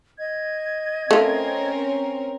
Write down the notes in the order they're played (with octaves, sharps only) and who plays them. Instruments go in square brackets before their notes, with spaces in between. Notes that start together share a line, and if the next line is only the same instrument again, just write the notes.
[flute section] D#5 G#6
[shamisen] A3 F4 [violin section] C4 C#4 A#4